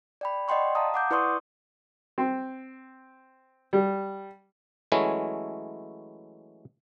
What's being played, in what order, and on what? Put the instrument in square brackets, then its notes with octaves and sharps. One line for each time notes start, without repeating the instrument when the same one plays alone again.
[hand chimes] D5 G5 B5
D5 D#5 F#5 G5 C6 C#6
F5 A5 A#5 D#6
F#5 D6 G6
E4 B4 D5 C6 C#6 D#6
[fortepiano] C4
G3
[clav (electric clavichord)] E3 F#3 G#3 A3 C#4 E4